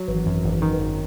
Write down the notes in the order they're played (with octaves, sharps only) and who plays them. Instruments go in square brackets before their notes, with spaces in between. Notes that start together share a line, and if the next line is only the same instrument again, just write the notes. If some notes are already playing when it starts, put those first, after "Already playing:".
Already playing: [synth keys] F#3
[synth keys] G#1 [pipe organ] E3
[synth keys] F#2
G#1
D#3
G#1